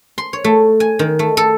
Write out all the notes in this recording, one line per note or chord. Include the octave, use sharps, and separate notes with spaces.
C6
C#5
A3
G#5
D#3
A3
A4